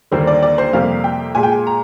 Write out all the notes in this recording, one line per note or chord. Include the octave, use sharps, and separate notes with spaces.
D#2 D3 G3 A#3 C5
D5
D5
C5
F2 C3 G3 A#3 F5
G5
A#2 G#3 G#5
G5
G#5
A#5